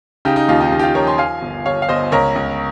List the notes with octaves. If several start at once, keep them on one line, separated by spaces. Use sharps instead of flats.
C#3 D#4 G4
D#4
D#2 F4
D#4 G4
D#2 D#4
G4
F4
F3 A#4 C#5
G#5 C6
F3 F5 G#5
G1
G1 C#5 F5
F5
G1 C5 D#5
C#2 A#4 C#5
C#2